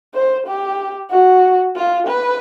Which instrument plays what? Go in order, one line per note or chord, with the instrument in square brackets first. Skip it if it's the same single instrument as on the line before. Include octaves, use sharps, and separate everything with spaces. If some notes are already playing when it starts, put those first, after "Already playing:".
[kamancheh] C5
G4
F#4
F4
B4